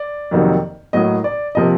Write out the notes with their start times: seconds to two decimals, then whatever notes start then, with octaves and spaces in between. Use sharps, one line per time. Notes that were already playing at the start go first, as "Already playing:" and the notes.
Already playing: D5
0.31 F2 C3 D#3 F#3 A#3
0.93 A2 F#3 A#3 D#5
1.24 D5
1.55 C3 F3 A#3 D#5